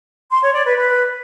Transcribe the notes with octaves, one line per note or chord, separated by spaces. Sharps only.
C6
C#5
D5
B4
B4